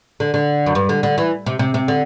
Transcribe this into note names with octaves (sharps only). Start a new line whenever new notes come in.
D3
D3
F#2
G2
D3
D3
E3
C3
C3
C3
D3